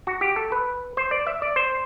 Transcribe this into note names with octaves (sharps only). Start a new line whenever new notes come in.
F#4
G4
A4
B4
C5
D5
E5
D5
C5